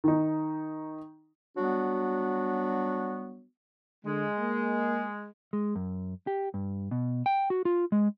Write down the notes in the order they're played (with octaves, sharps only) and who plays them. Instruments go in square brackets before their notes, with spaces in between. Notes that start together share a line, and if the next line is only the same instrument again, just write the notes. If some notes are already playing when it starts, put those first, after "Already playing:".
[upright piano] D#3 D#4
[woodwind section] F#3 G3 B3 D4 F#4
[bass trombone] D3 [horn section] G#3
[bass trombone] A#3
[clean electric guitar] G#3
F#2
G4
G2
B2
G5
F#4
F4
G#3